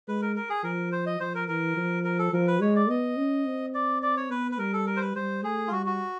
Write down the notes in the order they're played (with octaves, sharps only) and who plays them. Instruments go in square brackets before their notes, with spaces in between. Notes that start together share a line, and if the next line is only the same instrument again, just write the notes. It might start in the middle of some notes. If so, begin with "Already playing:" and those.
[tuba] G#3 [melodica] B4
[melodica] A#4
A#4
G#4
[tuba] F3 [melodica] A#4
[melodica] C5
D#5
[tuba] F3 [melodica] C5
[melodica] A#4
[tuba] E3 [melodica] A#4
[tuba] F3
[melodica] A#4
A4
[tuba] F3 [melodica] A#4
[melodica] B4
[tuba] G#3 [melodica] C#5
[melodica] D5
[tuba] B3 [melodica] D#5
[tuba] C#4
C4
[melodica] D5
D5
C#5
[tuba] B3 [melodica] B4
[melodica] B4
[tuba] G3 [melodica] A#4
[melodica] A4
A#4
C5
B4
[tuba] G3 [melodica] C5
[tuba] A3 [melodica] G#4
[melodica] F4
[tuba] G3 [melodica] F#4
[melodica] F#4